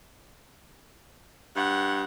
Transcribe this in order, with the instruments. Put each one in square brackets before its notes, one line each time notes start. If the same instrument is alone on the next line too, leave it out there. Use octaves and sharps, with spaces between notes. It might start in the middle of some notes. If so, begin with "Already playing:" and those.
[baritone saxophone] G2 [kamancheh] F#5